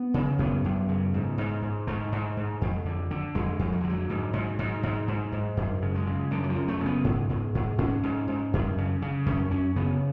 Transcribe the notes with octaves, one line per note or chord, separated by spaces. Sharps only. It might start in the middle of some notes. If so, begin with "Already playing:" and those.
Already playing: B3
C#3
F#2 B3
F#2
C#3
G#2
G#2
G#2
G#2 A3
G#2
G#2
F2
D3
D3
F2 G#3
F2
F#3
G#3
D3
F#3
G#2
G#2
G#2
G#2
G#2
G#2
F#2
C#3
G#3
C#3
F#2 D3
F#3
F3
F#2
A3
C#3
B3
G#2
G#2
G#2
G#2 C#4
G#2
G#2
F#2
C#3
C#3
F#2 C#4
F#2 C#4
C#3 B3